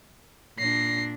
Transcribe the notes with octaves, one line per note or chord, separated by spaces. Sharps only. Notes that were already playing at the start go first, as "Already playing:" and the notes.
A#2 D4 A#6 C7